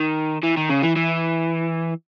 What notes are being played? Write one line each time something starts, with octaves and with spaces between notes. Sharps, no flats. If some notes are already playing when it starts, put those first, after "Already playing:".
Already playing: D#3
E3
D#3
C#3
E3
E3